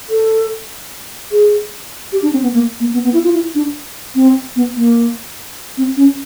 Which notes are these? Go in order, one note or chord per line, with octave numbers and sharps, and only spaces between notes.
A4
G#4
G4
D4
C4
B3
A#3
A#3
B3
B3
E4
F4
E4
D4
C4
B3
A#3
C4
C#4